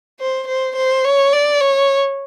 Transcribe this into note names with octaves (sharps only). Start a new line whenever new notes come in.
C5
C5
C5
C#5
D5
C#5